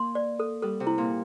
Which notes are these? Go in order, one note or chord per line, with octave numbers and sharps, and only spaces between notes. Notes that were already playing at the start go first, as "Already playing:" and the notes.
Already playing: A#3 C6
D5
A4
G3 A4
C3
E4
A#2